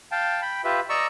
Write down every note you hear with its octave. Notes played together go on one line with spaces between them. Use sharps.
F5 G5 A5
G5 B5
F4 G4 B4 E5
D5 D#5 A#5 C#6 E6